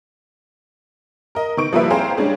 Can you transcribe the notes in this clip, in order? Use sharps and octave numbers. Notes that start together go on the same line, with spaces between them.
A#4 D#5
D#3 B3 C#6 D7
F3 G3 A#3 E4 B4 E5
C4 G#4 C5 F5 G5 A#5
G3 G#3 C#4 D4 G#4